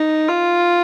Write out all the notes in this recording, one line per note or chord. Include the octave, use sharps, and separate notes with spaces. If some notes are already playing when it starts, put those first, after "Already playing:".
Already playing: D#4
F4